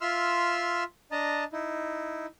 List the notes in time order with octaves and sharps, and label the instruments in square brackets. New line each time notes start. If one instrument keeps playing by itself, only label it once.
[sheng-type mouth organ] F4 E5 C6 E6 F6
D4 D#5 A5 A#5
D#4 E4